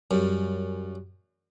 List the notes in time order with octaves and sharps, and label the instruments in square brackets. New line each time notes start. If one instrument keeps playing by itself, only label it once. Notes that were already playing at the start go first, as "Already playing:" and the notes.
[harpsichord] F#2 [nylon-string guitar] G3